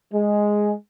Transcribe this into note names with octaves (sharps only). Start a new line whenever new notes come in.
G#3